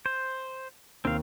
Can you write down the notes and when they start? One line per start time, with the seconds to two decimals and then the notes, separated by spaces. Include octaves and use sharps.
0.06 C5
1.05 D#2 C4 F5